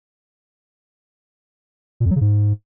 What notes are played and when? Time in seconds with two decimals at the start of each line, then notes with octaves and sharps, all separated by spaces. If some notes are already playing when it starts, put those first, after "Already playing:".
2.00 A#2
2.06 F2
2.11 F#3
2.16 C#3
2.21 G#2